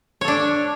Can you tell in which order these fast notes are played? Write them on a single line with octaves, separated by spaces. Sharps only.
C#5 A4 D4